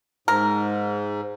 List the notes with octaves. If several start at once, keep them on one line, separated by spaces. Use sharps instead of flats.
G#2 A#4